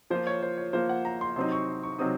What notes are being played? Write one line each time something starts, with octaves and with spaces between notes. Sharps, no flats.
F3 A#3 F4 C5
C#5
C5
C#5
F3 A#3 F4 C5
F#5
A#5
C6
C3 F#3 C4 D#4 C6
C#6
C#6
C3 F#3 C4 D#4 D#6